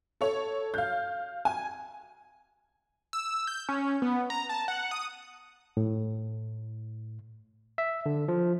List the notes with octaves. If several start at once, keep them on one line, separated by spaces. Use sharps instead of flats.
A4 C#5
F5 G6
G#5
E6
G6
C#4
B3
A#5
A5
F#5
D#6
A2
E5
D3
F3